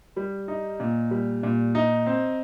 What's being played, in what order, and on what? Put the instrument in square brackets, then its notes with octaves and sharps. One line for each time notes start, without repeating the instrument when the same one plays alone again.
[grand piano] G3
D#4
A#2
G3
A#2
D#4
C4